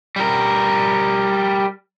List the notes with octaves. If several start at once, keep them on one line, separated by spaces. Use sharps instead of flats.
G3 A#4